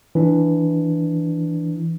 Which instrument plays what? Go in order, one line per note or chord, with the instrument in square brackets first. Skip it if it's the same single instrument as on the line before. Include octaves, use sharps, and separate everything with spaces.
[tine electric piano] E3 D4